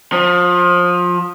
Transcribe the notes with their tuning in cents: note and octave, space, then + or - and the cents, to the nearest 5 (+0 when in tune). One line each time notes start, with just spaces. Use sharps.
F3 +25